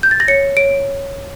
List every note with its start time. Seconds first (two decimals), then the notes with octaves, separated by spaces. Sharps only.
0.03 G6
0.11 A6
0.20 A#6
0.28 C#5 C#7
0.57 C#5 D7